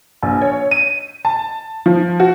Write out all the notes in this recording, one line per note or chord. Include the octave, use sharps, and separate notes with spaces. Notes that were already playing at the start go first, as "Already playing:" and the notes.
A#1
C#5
D#7
A5
F3
F#4